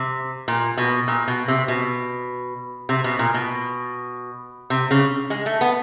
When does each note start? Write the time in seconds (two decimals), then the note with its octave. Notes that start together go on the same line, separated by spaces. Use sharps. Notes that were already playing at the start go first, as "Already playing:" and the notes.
Already playing: C3
0.48 A#2
0.77 B2
1.08 A#2
1.28 B2
1.48 C3
1.68 B2
2.89 C3
3.04 B2
3.19 A#2
3.34 B2
4.70 C3
4.91 C#3
5.30 G#3
5.46 A3
5.61 B3